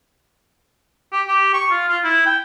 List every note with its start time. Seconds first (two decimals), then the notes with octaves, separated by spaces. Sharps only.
1.12 G4
1.28 G4
1.54 C#6
1.71 F4
1.89 F4
2.04 E4
2.26 G5